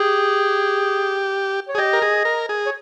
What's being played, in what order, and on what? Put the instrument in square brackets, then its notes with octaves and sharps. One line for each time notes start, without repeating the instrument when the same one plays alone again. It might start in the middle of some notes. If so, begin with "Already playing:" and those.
Already playing: [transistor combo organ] G4 [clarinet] G#4
[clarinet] C#5
[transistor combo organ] G#4
[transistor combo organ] G4 [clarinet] D#5
[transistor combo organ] A#4
G#4
A#4
G#4
[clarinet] C#5